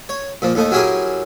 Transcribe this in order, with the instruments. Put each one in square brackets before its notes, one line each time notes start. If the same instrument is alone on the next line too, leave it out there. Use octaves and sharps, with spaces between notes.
[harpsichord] C#5
A#2 F3
D#2 A3 D#4
F#3 C#4 E4 G4 G#4 A#4